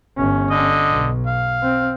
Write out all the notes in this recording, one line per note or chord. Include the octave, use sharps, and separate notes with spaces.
G1 C#4
D3 D#5
B1
F5
C4